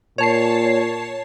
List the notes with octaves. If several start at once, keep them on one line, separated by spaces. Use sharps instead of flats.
A#2 C#5 A5 C7